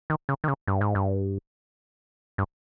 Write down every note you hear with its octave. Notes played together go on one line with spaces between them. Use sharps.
D#3
C#3
D#3
C#3
G2
G#2
G2
G2